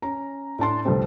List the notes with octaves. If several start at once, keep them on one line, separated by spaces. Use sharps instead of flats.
C#4 A#5
A2 D4 A5 C6
G1 C2 F3 G3 A3 C4